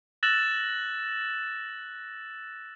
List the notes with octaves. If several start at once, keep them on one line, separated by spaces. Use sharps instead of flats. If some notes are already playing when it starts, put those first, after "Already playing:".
E6 F#6 A6 A#6 E7 F#7